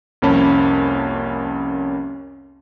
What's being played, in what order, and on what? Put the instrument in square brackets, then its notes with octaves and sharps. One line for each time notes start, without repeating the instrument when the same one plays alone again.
[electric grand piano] C2 F2 A#3 C#4 A5 B5